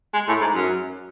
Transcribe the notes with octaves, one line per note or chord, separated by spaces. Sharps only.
G#3
A2
G#2
F#2